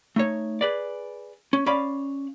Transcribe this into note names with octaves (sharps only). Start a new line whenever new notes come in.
A3 D#4 C#5
G#4 B4 D5
C#4
C#4 D5 F5 B5